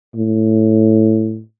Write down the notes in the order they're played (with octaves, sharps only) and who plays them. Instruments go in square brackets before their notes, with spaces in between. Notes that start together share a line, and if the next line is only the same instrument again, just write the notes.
[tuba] A2